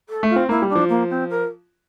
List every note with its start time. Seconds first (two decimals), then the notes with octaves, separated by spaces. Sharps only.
0.09 A4
0.23 A3
0.29 F4
0.36 C4
0.49 A#3 E4
0.62 G3
0.69 D4
0.75 F3
0.89 A#3
1.10 C4
1.29 A#4